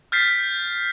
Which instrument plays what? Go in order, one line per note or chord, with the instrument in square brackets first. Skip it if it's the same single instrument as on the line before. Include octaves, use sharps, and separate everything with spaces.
[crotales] F6 G6 A6 B6 C7